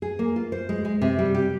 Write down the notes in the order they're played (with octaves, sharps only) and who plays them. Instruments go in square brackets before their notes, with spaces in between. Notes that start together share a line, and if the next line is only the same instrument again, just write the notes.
[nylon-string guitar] G#4
A#3
F4
C5
G#3
G#3
C3
G3
G4